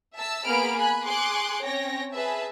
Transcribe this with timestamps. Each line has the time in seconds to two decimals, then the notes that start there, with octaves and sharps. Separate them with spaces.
0.17 E5 A5 E6
0.47 A#3 B3 G#4 B5 F6 D7
0.78 G#5 B5 F#6
1.07 G#4 C6 D6 F#6
1.63 C4 C#4 C#5 G5 A#6
2.14 G#4 B4 E5 A5